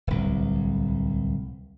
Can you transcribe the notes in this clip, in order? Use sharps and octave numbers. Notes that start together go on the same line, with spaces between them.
D1 C2